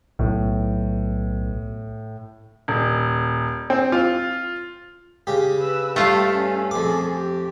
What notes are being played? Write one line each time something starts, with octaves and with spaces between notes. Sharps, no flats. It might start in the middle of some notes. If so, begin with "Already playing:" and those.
B1 A2
D#1
C4
F4
C#3 G4
B4 E6
G2 A3 F4 F5 G5 A5
C#4 A4
F2 G#4 A4 D6
G4